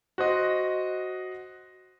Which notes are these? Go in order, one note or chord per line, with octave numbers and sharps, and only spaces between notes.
F#4 C5 D#5